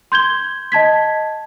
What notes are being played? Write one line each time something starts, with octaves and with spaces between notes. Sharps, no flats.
C6 G6 G#6 G7
D#5 A5 G#6 B6